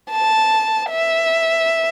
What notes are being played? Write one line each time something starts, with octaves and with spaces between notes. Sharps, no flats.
A5
E5